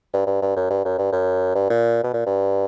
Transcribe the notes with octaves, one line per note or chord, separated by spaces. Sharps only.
G2
G2
G2
F#2
G2
F#2
G2
F#2
G2
A#2
B2
A#2
G2